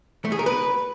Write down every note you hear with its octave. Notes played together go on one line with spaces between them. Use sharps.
A3
G#4
A#4
B4